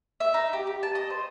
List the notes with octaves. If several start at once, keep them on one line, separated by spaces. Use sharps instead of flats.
E5
D#4
G4
G4
A5
D#5
C5